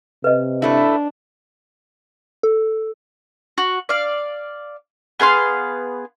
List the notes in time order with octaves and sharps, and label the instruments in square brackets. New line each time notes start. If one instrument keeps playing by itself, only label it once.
[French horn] C3 [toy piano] B4 D#5
[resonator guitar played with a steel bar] G2 A3 E4 [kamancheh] D4
[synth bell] A4
[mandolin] F#4
D5 F5
B3 G#4 F5 C6